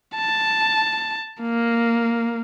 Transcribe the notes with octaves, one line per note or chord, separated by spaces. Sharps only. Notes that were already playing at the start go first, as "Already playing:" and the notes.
A5
A#3